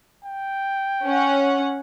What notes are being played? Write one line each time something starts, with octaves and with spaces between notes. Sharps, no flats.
G5
C#4 F#5